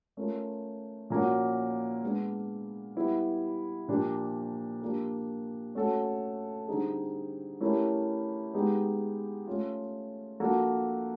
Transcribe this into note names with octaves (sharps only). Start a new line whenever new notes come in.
A3 C#4 F4 A#4
A#2 F3 A#3 C#4 F#4
G#3 B3 D4
G3 B3 E4
A#2 F3 A#3 D4 G4
F3 A#3 D4 G4 A#4
A3 C#4 F#4 A4
D3 G3 C4 D#4 G#4
A3 C#4 E4 G4 A#4
G#3 B3 D#4 G4
A3 C#4 F4
F3 A#3 D4 F#4 A4